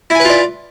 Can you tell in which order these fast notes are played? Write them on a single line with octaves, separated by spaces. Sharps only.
E4 G#5 B4 F4 D5